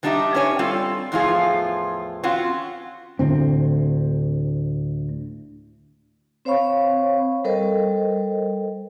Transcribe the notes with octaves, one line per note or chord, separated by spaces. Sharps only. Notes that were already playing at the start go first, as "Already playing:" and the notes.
E3 G3 D4 D#4 G4 E5
C#4 D4 C#5 G#5
G3 C4 F4 A4
E2 A2 F3 F4 G#4
C4 C#4 F4 F#4 F#5
D2 A2 D3 C4
C4 C5 C#5 F5 B5 C#6
G3 A4 A#4 C5 D#5